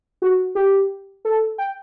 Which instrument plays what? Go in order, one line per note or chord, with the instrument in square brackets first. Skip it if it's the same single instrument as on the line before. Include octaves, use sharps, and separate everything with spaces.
[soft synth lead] F#4
G4
A4
G5